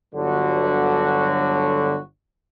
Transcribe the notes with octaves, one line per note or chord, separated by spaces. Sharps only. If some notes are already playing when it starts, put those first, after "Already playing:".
G1 D3 F#3 F#4